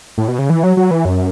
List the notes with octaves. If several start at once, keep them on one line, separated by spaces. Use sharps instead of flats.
A2
B2
C#3
E3
F#3
F#3
E3
F#2